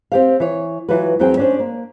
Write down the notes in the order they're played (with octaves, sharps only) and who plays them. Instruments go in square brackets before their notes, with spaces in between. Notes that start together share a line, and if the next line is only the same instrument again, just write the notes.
[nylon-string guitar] C4 G4 F5
E3 C#5
E3 F#3 F4 F#4 B4
E2 F#3 C4 G#4 G5
C#4 D4 C5
A#3